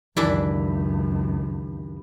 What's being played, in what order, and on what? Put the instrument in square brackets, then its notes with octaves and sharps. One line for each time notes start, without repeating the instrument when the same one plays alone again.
[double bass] C#2 F#2 [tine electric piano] D#3 G4 B5 [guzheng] E3 D4 E4